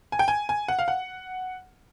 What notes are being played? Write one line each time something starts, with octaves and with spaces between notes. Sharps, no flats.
G#5
G5
G#5
G#5
F#5
F5
F#5